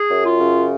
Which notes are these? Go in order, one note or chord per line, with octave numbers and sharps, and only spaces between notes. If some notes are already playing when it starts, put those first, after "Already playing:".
Already playing: G#4
F#2
F4
C#3